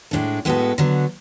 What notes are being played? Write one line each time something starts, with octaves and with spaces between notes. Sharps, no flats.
A2 G#3 D4 A4
A2 G#3 B3 F#4 A4
D3 F#3 B3